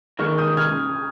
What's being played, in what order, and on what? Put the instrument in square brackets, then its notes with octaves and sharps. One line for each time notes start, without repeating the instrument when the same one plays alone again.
[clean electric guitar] D#2 D#3 G#3 [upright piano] C#6 F6
[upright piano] D#6 G6
F6 G#6